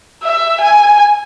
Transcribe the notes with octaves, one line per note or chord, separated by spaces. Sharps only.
E5
G#5